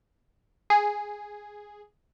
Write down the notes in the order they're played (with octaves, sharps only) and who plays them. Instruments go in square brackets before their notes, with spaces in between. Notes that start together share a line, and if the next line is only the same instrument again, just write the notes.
[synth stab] G#4